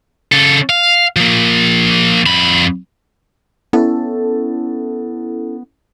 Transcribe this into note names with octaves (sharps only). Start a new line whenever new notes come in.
C#3 A4
F5
F3 A#3
F2 B5
B3 C#4 E4 A4